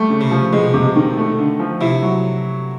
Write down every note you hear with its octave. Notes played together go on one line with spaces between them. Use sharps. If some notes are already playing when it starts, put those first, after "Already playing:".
Already playing: G3 A3
C#3
C3
F3
B2 G#3
C3
D#3
A3
D3
F3
C3 E4
F#3